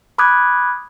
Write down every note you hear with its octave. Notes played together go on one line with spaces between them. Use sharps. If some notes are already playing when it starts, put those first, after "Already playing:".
B5 D6 D#6 F6 F#6 G#6